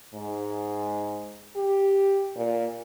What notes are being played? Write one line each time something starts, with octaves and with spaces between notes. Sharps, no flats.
G#2
G4
A#2